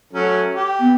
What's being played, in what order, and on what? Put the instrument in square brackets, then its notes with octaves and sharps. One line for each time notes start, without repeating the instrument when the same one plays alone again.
[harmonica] F#3 A3 C#4
G4
[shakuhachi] B3